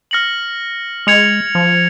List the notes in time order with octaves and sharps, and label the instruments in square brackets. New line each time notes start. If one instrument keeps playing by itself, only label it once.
[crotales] F6 A#6 C#7 F#7
[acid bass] G#3 [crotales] G#6 C#7 F7
[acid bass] F3